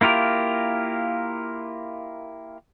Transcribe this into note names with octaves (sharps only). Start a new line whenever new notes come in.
A#3 E4 F4 G4 A#4